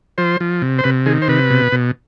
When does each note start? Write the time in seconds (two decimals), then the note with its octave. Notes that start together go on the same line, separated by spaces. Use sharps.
0.18 F3 C5
0.40 F3
0.62 C3
0.79 C5
0.84 C3 B4
1.06 D#3 G#4
1.22 C5
1.28 C3 B4
1.50 B2
1.72 B2